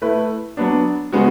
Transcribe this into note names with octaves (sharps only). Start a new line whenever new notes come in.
A3 E4 B4
F#3 B3 D4
C#3 G#3 B3 F#4